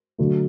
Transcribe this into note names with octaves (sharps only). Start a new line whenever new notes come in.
D3 F#3 A3